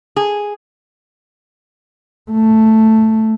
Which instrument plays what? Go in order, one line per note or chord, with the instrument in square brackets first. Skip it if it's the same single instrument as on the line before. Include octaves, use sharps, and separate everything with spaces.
[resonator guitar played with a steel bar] G#4
[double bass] A3